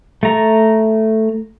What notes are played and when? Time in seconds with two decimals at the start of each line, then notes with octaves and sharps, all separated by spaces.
0.23 A3 A#5